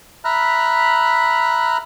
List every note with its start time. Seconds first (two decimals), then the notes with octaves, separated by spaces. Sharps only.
0.25 E5 A#5 B5 F6 F#6